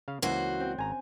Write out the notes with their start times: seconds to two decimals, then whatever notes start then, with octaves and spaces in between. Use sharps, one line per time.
0.08 C#3 F5
0.22 C#2 E3 A#3 C#4 F#4 C5 F#6
0.60 C4
0.78 G#1 G#5 A#5